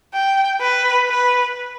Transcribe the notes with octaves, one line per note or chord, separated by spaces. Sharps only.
G5
B4
B4